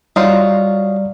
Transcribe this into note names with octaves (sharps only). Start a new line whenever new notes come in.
F#3 G3 D#4 F4 D5